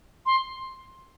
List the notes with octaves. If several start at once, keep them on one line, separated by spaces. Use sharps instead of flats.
C6